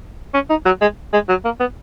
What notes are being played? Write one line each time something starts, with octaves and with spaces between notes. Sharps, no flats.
C#4
D#4
F#3
G#3
G#3
F#3
A#3
B3